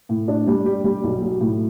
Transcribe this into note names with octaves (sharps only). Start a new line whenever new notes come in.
A2
D4
G3
G4
G3
B1
F#3
A2